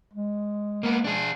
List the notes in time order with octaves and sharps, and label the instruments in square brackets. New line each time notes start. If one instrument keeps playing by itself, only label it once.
[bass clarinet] G#3
[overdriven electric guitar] A#3 B3
D4 G#4